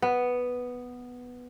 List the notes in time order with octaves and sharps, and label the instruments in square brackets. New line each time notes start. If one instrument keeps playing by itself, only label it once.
[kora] B3